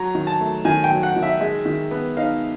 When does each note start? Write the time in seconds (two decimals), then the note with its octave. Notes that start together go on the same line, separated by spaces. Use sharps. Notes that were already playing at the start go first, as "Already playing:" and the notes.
Already playing: F#3 A#5
0.15 D#3
0.27 A5
0.40 A3
0.65 D#3 G#5
0.84 G5
0.90 F#3
1.03 F#5
1.16 D#3
1.23 E5
1.41 G#3
1.66 D#3
1.91 B3
2.17 D#4 F5